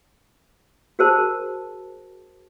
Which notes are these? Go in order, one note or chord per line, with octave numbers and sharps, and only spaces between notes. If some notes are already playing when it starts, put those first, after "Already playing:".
F#4 G#4 A#4 C5 A5